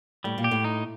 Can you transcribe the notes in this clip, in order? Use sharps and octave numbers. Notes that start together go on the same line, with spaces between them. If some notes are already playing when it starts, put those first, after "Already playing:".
A2 G3
A#2
G4
A2
D#4